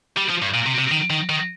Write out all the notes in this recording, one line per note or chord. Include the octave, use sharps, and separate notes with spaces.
G3
F3
G2
A#2
C3
C3
D#3
D#3
D#3